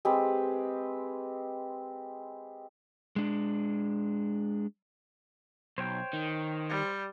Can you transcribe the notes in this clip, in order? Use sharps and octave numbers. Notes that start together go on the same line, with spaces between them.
G#3 C4 G4 B4
G#3 D4
B1 C5 C#5 G5
D#3
G3